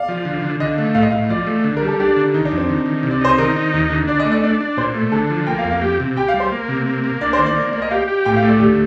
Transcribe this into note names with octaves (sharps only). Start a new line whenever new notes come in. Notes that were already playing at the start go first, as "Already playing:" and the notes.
Already playing: D5 F5
F3
D3
D3
D3 D#5
A3
A2 F5
D#5
A2 F5
F3 D5
A3
D3
A#4
G3
A4
D4 G4
D3
D#3 D#4
D4
F2
C4
D#3
D#3
C3
D5
D#4 C5
D#3 A#4
D#4
D#2
D3
D4 D5
D#5
A3
D#5
D4 D5
D4
A#2 C5
A3
D3 A4
F3
A#3 G5
F5
F2
F5
G4
C3
G4 G5
F5
G3
C5
A#3
C3
A#3
A#3
D4 D5
C5
D#3
D5
A#3
A#3 D5
D#5
G4 F5
G4
A2 G5
F5
A3
D5
D2 G4